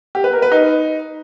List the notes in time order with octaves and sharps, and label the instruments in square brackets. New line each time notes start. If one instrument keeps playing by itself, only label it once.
[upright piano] G4
B4
A#4
B4
D#4